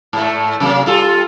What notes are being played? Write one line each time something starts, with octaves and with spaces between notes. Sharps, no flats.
G#2 A3
C3 F#3 A#3
G3 F4 A4